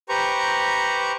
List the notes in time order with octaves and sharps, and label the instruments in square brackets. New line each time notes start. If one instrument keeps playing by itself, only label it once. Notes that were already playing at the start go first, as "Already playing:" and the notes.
[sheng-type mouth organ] G4 B4 C5 A#5 C#6